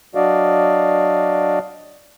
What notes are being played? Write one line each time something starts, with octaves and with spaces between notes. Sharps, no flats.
F#3 D4 F#4 D5 D#5 F5